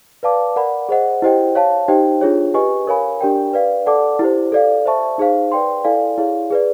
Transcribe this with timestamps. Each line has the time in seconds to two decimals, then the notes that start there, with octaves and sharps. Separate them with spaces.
0.23 B4 D5 F5 A5 D6
0.56 A#4 D5 F#5 B5
0.89 G#4 C5 D#5 F#5
1.22 E4 G4 C5 D#5 G5
1.55 C#5 F5 A5
1.88 D#4 G4 C5 D#5 G5
2.21 D4 F4 G#4 C#5
2.54 G4 B4 D#5 G#5 C#6
2.87 A#4 C#5 F5 G#5 B5
3.21 D4 G4 A#4 D5 G5
3.53 B4 D5 F5
3.86 A4 D5 F#5 A5 D6
4.19 E4 G4 C5
4.52 A4 D5 F5
4.86 C5 E5 A5 C#6
5.18 D#4 G#4 C5 F5
5.52 B4 D5 G5 C6
5.84 E4 A4 D5 F5 G#5
6.18 E4 G#4 C#5 F5
6.51 G#4 B4 D5